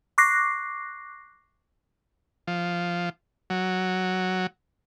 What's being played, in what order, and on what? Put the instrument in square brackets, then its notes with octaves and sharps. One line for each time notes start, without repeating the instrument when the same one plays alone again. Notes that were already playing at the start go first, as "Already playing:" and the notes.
[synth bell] C#6 D6 F#6 A#6 C7
[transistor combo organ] F3
F#3